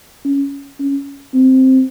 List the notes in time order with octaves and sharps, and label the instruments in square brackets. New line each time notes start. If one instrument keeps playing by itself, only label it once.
[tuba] C#4
C#4
C4